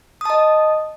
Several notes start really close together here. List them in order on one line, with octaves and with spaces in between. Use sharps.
D#6 A5 D#5